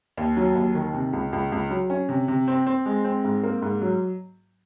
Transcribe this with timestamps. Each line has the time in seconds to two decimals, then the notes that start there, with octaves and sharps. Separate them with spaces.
0.17 D#2
0.37 F#3
0.56 D#2
0.75 D#3
0.94 C3
1.13 C#2
1.33 C#2
1.52 C#2
1.70 F#3
1.90 C#4
2.09 C3
2.28 C3
2.48 C4
2.67 C4
2.86 G#3
3.05 C4
3.24 G#2
3.43 A#3
3.62 G#2
3.82 F#3